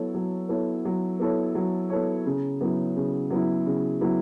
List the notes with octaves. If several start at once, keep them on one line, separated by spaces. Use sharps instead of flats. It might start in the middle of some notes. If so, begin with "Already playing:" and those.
Already playing: F#3 B3 E4 A4 C#5
F#3
B3 E4 A4 C#5
F#3
B3 E4 A4 C#5
F#3
B3 E4 A4 C#5
C#3
F#3 B3 E4
C#3
F#3 B3 E4
C#3
F#3 B3 E4